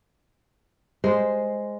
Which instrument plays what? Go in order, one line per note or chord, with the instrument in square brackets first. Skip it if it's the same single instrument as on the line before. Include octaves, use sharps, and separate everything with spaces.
[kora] G#3 [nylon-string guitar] C5